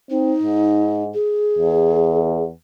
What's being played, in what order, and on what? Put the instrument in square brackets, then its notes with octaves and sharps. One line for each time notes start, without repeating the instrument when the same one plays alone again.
[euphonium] C4 [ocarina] D#4
[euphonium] G#2
[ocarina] G#4
[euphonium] E2